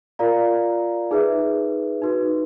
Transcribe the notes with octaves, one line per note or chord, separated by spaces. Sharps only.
F4 A#4 D5 F5 A#5
D#4 G#4 B4 E5
D#4 F#4 B4